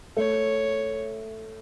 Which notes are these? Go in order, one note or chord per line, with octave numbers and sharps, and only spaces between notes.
A3 C#5